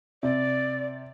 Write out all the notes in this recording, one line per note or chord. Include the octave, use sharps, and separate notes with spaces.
C3 D5